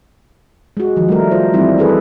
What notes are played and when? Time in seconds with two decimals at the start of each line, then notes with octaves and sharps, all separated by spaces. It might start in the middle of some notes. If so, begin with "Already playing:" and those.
0.77 G#3 F#4
0.97 D#3 F3
1.09 G3 A3 A#4
1.31 F4 F#4 C5
1.54 E3 G3 C4 D#4 E4
1.78 D#4 G#4 A4 B4